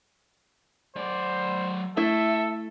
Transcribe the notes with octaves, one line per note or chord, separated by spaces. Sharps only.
F#3 C5 D5
A3 E4 A4 E5